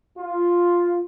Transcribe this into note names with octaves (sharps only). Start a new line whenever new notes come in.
F4